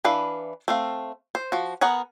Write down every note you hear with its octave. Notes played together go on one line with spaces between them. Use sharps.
E3 D4 B4 F5
A3 C4 F5
C5
F3 F#4
B3 G#4 A#4 F#5